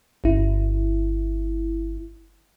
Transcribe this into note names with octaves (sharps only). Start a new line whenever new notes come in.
G1 E4